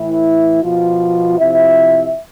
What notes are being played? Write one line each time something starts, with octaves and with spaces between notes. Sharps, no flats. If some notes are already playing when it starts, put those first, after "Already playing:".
Already playing: A2 E3 E4
B2 F3 F4
C3 F3 E4 E5